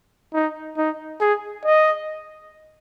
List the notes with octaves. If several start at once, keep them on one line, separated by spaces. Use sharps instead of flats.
D#4
D#4
G#4
D#5